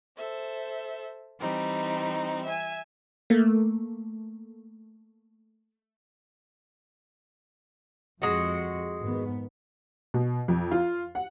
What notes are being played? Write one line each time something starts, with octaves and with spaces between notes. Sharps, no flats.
A4 C5 E5
E3 G3 C4 D#4
E5 G#5
A3 A#3
F2 G#3 F#4
G#2 D#3 B3
B2
F2
F4
F#5